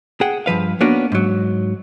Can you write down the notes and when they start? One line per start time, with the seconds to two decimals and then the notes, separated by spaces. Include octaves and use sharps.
0.21 G#4 F#5 G5
0.46 G2 F3 B4 F5
0.81 A#3 B3 C#4 D4 F#4
1.12 G#2 F#3